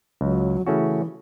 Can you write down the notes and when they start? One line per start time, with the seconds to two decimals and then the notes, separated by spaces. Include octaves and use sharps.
0.21 C#2 F#3
0.66 C#3 E3 A3 C#4 F#4